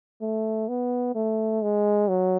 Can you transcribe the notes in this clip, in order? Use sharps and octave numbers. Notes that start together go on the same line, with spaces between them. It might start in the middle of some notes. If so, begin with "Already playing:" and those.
A3
B3
A3
G#3
F#3